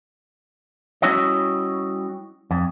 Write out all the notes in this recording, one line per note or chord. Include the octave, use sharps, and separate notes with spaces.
G3 C#4 E4 F#4 C#5 D#5
F2